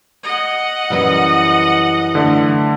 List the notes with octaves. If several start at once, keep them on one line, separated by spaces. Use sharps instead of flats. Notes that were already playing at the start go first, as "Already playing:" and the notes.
D#5 F#5
F#2 E3 G3
D3 A3